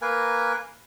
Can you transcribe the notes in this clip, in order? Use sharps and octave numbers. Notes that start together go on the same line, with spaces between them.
A#3 A#4 B4 G#5